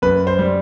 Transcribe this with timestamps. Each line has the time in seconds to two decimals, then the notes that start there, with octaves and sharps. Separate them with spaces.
0.02 F#2 B4
0.27 C5
0.39 G3